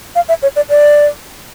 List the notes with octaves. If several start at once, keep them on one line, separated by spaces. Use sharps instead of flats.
F5
E5
C#5
D5
D5